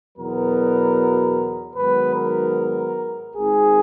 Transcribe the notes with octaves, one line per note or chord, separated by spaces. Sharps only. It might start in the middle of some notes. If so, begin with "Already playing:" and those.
E2 B2 F#3 B3 A#4
G#2 D#3 F#3 B3 B4
A#4
G#1 G#2 D#3 G#4